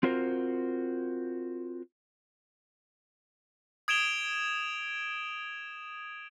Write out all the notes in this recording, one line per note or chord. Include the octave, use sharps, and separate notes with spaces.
C4 F4 F#4 A#4 C5
D#6 G#6 D7 E7 F7 G7